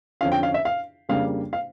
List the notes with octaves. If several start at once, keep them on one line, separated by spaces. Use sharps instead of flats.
F2 D3 F3 C#4 F5
G5
F5
E5
F5
F2 C#3 G3 A#3 D4 F5
F5